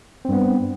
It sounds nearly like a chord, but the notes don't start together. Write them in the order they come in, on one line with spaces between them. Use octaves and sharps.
C4 G2 B3